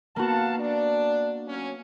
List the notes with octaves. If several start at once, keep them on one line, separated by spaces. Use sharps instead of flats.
A#3 B3 F#4 F5 F#5 A5
D4
F#3 C#4